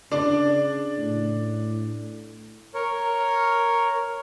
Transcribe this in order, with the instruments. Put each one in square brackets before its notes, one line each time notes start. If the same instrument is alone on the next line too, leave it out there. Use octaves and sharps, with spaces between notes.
[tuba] C#3 [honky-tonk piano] D4 D5
[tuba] A2
[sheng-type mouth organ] A#4 C#5